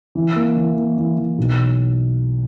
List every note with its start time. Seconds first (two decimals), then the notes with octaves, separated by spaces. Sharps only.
0.15 E3
0.36 A#3
0.57 E3
0.77 A#3
0.97 E3
1.17 E3
1.38 B1